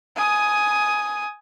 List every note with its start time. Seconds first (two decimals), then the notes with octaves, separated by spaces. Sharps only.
0.16 G#5 D#6